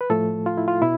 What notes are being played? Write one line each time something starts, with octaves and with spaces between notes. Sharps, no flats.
B4
A2 F3 A3 A4
F4
E4
F4
B2 E4